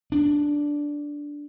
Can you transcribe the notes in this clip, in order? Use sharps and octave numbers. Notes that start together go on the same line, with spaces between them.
D4